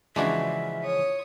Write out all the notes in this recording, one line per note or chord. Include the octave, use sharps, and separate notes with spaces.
C#3 E3 F3 G#3 D4 F#4 E5
C#5 D#6